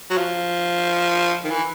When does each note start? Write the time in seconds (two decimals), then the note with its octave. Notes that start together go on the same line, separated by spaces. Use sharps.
0.10 F#3
0.18 F3
1.44 D#3
1.51 E3